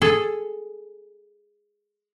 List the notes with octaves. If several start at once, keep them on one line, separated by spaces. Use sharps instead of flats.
G#4 A4